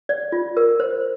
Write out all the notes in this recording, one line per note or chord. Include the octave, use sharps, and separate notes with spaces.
D5
F4
A#4
C5